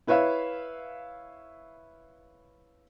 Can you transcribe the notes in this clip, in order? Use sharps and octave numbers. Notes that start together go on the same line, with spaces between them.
E4 B4 C#5 E5 F5